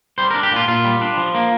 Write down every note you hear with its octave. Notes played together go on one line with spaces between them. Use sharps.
G3 C5
D4 A#4
G4
A#2 F4
A#2 F4
G3
D4
F3
A#3